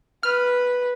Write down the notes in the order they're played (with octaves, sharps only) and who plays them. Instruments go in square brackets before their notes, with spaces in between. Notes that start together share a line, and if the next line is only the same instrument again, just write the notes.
[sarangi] B4 [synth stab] F6